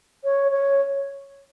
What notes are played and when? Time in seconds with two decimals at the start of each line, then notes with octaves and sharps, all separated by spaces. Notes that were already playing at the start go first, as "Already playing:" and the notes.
0.24 C#5
0.52 C#5